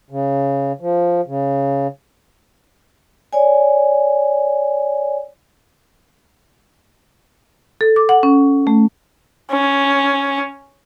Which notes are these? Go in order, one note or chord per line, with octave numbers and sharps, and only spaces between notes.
C#3
F3
C#3
C#5 D5 G#5
A4
D6
F#5
C#4
A3
C#4